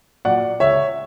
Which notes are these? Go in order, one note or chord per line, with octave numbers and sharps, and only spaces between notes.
A#2 F#3 D5 F#5
C#2 C#5 E5